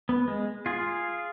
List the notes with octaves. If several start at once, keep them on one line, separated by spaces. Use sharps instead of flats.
B3
G#3
F4 G#4